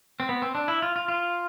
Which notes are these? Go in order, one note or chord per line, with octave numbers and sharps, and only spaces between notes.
C4
B3
C4
D4
E4
F4
F4
F4